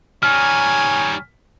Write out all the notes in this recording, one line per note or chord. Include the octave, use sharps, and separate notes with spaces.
G3 D#4 C#5 G#5 F6